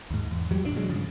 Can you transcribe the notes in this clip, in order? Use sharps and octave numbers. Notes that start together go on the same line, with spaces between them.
D#2 G#2
E2
E2 F#3 G3
A#1 G2 D3 D4
B2 F#3 G#3
G2 C#3 F3